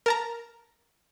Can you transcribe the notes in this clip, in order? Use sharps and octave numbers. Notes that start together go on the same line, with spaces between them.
A#4 A5 A#5